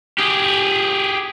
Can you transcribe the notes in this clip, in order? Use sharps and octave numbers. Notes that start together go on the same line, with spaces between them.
G4 G#4